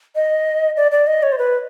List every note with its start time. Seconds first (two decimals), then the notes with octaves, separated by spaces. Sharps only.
0.15 D#5
0.77 D5
0.92 D5
1.07 D#5
1.23 C#5
1.32 C5
1.38 B4